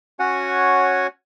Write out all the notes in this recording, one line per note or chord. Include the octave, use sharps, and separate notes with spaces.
C#4 F#4 C#5 F#5 G#5